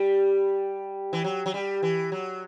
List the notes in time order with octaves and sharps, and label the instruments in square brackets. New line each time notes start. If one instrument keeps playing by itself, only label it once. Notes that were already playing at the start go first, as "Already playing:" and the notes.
Already playing: [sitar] G3
E3
F#3
F#3
G3
E3
F#3